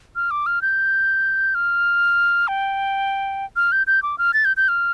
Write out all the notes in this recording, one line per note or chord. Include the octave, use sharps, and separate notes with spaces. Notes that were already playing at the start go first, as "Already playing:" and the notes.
F6
D6
F6
G6
F6
G5
F6
G6
G6
D6
F6
A6
G6
G6
F6